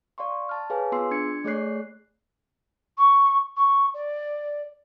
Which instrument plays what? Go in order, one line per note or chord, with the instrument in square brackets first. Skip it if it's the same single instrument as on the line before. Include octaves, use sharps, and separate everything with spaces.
[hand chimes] D5 F5 C6 C#6
A5 F6
G#4 B4 C#5 F5 G#5
B3 F4 G#4 C6 E6 C7
D4 G#6 C#7
A3 G#4 C#5 D5 F#6 C7
[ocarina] C#6
C#6
D5